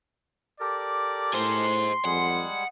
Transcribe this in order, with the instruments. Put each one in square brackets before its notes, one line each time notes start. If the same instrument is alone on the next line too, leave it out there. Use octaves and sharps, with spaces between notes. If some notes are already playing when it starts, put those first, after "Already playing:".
[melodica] G4 A4 A#4 [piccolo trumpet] D5
[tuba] A2 [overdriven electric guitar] G#4 C5 [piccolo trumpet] C6
[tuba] F2 [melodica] G3 G#3 G#4 [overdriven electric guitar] F#5